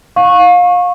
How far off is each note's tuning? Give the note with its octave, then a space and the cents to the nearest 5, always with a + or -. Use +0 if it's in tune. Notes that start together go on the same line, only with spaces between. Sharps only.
F5 +30 C#6 -20